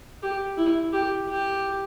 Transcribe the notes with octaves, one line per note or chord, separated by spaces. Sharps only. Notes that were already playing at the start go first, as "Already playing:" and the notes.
G4
E4
G4
G4